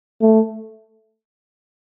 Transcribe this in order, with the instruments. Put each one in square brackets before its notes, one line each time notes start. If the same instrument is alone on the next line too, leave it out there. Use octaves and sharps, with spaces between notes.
[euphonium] A3